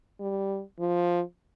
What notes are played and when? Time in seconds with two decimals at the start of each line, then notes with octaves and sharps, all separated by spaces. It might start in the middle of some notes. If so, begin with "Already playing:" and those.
0.20 G3
0.80 F3